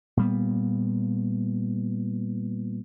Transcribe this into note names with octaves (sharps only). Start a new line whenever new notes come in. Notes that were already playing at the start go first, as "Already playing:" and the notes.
A#2 G3 B3